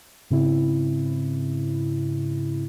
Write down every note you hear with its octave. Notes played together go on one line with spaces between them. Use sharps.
G#2 C#3 C4 E4